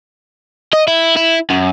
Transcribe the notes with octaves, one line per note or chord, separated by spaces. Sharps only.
D#5
E4
E4
F#2